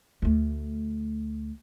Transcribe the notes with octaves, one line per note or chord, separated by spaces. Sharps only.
D2 A3